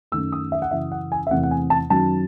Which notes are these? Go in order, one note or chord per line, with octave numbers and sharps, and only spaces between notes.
F#2 D#3 A3 E6
D#6
E5
F#5
F#2 C#3 E3 E5
F#5
G#5
E5
E2 C3 E3 A3 C4 F#5
F#5
G#5
A5
F#2 D#3 F#3 A5